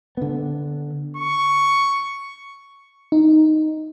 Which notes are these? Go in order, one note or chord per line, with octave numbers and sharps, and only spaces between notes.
D3 B3
C#6
D#4